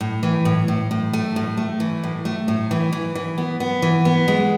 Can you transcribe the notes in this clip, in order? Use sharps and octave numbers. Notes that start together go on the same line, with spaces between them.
A2
E3
A2
A2
A2
A3
A2
A3
E3
A2
A3
A2
E3
E3
E3
B3
B3
E3
B3
G#3